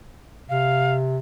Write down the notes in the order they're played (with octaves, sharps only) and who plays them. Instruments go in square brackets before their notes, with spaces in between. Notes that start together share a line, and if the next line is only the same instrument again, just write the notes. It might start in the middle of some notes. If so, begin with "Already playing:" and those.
[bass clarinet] C3 [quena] F5